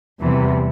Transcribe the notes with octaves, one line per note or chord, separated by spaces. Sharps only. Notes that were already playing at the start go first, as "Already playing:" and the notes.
E2 C3 E3 G3